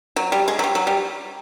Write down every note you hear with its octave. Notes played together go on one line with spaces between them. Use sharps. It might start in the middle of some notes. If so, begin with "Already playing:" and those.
F#3
G3
G#3
F#3
G3
F#3
G3